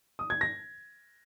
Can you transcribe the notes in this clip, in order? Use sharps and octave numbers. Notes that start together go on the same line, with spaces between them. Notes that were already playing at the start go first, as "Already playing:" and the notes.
D#6
G#6
A#6